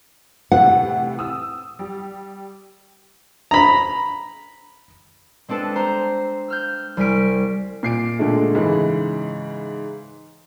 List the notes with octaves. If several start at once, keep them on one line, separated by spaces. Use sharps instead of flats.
A2 C3 E3 F#5
D#6 E6
G3
A#5 B5
G#3 C4 D4 A4 B4
C5 A#5
E6 F6 G6
C2 G3 G#5 F6 B6 D7
A#2 C7 D7
A#2 D3 G#3 A3
G#2 C#3 E3